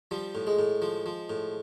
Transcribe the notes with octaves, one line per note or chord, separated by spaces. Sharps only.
F3 G3
A2
G#3
A2
F3
F3
A2